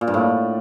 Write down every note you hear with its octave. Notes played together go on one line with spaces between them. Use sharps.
A#2
G2
A2